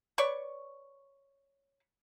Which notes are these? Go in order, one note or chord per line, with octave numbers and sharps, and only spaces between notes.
B4 C#5 D5 C#6